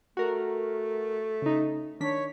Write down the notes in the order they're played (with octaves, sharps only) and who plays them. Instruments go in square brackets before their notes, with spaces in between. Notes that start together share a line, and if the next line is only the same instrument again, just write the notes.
[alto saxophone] A3 [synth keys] F#4 A#4
[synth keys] C#3 D#4
[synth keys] D#3 D4 B6 [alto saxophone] C#5